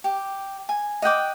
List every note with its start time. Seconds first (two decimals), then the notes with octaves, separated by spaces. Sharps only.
0.04 G4
0.69 G#5
1.02 D#5 F#5 G5 D6